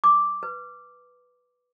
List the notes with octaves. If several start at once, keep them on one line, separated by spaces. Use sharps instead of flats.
D6
B4